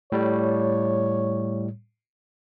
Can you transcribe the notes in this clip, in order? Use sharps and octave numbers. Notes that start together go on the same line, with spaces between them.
A2 G3 C#5